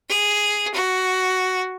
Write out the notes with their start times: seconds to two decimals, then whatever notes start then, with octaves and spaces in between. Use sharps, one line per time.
0.09 G#4
0.74 F#4